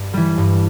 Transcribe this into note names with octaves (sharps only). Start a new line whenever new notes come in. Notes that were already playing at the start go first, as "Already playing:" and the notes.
Already playing: G2
E3 G3
G2